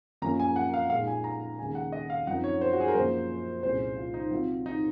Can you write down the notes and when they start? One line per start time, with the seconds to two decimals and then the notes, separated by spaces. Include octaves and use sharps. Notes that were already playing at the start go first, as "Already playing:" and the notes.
0.22 F#2 F3 A#3 C#4 A#5
0.39 G#5
0.56 F#5
0.74 F5
0.90 A#2 G#3 D#4 F5
1.07 G#5
1.24 A#5
1.58 D#2 C#3 G#3 D#4 G#5
1.75 F#5
1.92 D#5
2.10 F5
2.27 F#2 F3 C4 D#4 F#5
2.44 C#5
2.61 C5
2.73 F#4
2.80 G#4
2.88 A#4
2.95 F#2 F3 A#3 C5
3.63 C2 A#2 G#3 C#4 C5
3.97 F4
4.14 D#4
4.31 C3 F#3 C4 F4
4.66 D#4